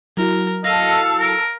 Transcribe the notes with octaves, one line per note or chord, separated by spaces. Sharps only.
F#3 E4 F#4 A#4
A4 D#5 F5 E6
A#4